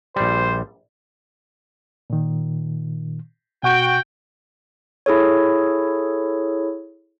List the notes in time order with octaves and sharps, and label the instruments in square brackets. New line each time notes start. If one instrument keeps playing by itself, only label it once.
[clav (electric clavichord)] A#1 G3 [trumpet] C5
[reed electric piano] A#2 D#3
[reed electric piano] B2 F#5 C#6 [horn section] F#4 G5
[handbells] E4 G#4 A4 C#5